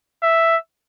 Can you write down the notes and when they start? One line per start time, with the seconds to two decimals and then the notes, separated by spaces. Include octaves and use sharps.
0.22 E5